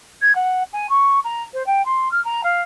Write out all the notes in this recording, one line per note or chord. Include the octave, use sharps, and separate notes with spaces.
G#6
F#5
G#5
C#6
A#5
C5
G5
C6
F6
A#5
F5